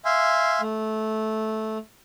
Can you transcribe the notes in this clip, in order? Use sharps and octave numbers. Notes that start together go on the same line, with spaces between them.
E5 F5 G#5 C6
A3